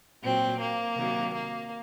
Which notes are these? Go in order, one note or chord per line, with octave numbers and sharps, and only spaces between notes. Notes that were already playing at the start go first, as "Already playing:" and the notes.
A#2 F#3 C4
A#3
C3 D#3 F#3
A#3